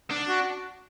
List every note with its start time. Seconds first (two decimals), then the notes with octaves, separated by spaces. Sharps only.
0.11 D4
0.29 F#4